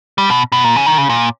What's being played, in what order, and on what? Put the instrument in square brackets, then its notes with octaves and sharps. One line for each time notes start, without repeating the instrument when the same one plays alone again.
[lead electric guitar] G3
B2
B2
A#2
C#3
D#3
C#3
A#2